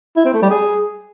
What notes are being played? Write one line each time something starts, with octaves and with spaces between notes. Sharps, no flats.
E4
C4
A3
G3
G#4